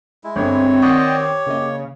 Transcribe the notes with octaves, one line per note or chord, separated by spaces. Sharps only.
G#3 E4
G1 C4 C#5
D#3 D5 D#5 F#5 G5 C#6
G4
C#3 A#3 D#5